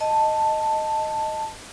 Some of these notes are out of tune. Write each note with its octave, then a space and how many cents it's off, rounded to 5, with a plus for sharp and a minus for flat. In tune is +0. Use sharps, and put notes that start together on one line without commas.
D#5 +0 A5 +5